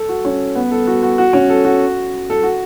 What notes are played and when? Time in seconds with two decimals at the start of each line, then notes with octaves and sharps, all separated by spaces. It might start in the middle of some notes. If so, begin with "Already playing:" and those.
Already playing: A4
0.09 F#4
0.25 C#4
0.55 B3
0.71 A4
0.87 F#4
1.03 F#4
1.18 F#4
1.33 C#4
1.50 A4
1.65 F#4
2.30 A4
2.43 F#4